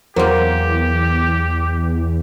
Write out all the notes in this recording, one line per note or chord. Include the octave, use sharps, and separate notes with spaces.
E2 F#3 A#3 G4 A#4 C5